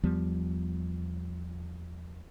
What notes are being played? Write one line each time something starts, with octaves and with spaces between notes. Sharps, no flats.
E2 F3 G3 B3